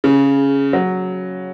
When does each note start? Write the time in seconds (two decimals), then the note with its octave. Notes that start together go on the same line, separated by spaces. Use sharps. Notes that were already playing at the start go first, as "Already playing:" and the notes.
0.04 C#3
0.73 F#3